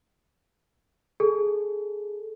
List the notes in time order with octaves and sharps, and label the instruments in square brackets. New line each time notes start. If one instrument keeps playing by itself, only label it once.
[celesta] G#4 A4